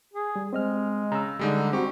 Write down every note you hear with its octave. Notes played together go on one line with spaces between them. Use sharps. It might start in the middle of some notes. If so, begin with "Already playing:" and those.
G#4
G3
G#3 C4 D#5 F6
C#3 A#5 E6
D3 G3 G#3 D#4
C4 F#4 G4 C#6